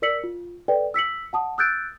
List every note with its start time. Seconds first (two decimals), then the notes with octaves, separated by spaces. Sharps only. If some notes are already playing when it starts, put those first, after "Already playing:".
0.02 A#4 D5 E6 B6 C#7 F#7
0.24 F4
0.68 A4 B4 D5 G5
0.94 E6 B6 C#7 F#7
1.33 F#5 A5 D#6
1.58 D#6 E6 F#6 G6 A6 D7